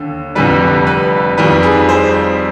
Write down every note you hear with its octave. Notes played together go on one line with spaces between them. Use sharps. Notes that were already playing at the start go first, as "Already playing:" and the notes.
Already playing: D#2 D3
F1 F2 D3 G3 B4
B4
F2 D#3 G3 B4
G#4
C5